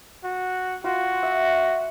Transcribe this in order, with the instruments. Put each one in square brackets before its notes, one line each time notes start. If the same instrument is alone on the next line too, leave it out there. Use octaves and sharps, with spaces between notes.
[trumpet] F#4
[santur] F4 [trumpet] F#4
[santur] E5